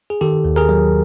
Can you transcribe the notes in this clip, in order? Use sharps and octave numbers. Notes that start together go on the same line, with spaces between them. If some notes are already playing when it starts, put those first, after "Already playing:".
G#4
D#3 G4 A4
D#2
G#4 A#4
F#3